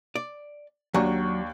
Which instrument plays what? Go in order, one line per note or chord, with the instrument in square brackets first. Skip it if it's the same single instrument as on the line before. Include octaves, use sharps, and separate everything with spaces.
[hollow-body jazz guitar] D5
[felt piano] D#2 D4 C#6 [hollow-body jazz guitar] F#3